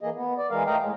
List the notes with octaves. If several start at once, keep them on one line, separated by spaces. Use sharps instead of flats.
E3 A#3 G#4 D#5
B3
D5
E3 G#3 A#4 F5
A2 A3 D#5 F5 G5 A#5
A2 G#3